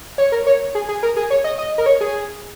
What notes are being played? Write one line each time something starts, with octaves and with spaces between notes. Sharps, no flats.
C#5
A#4
C#5
G#4
G#4
A#4
G#4
C#5
D#5
D#5
A#4
C#5
G#4